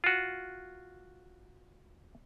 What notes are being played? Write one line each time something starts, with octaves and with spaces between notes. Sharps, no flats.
F4 F#4